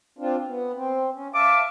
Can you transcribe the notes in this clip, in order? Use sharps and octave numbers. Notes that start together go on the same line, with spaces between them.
C4 D4 F4
B3
C4
C#4
E5 F5 A5 D6